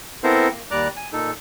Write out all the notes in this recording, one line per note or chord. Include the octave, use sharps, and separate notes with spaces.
B3 C4 E4 A4 A#4 C5
A#3
D#2 G3 D5 A#5 D6 F#6
G#5
A#2 D#4 A4